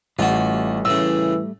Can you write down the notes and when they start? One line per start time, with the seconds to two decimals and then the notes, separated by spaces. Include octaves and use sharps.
0.19 A1 G3 A3 F4 F#4
0.85 A2 C#3 E3 E6